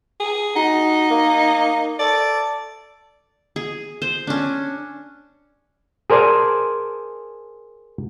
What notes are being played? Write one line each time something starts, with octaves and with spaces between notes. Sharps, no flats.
G#4
D#4 F#4
A#3
A4 D5
G#4
C5
C#4 D4
G#4 A#4 C5 D5 G#5 A5